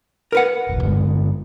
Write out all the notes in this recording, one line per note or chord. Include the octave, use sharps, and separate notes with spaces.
A#4 B4 F#5
E1 A1
G2 D3 G#3